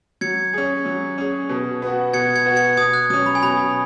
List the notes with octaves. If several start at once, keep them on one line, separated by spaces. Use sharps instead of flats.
F#3 G#6 C#7
C#4 G#4
F#3
C#4 G#4
B2
B3 F#4
B2 G#6 C#7
G#6 C#7
B3 F#4
G#6 C#7
B2 D#6 G#6
F#6
F#3 C#4 D#6
B5
G#5
B2 B5